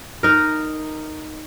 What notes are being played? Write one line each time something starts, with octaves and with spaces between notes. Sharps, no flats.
D#4 A#4